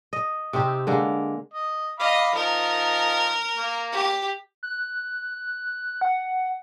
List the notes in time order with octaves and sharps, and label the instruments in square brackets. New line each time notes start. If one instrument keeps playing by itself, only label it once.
[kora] D#5
C3 C4 D#4 G4
D3 G#3 A#3
[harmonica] D#5
[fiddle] D#5 [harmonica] F5 B5 D6
[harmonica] F3 D#4 [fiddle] A#4
[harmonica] A#3
[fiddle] G4
[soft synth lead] F#6
F#5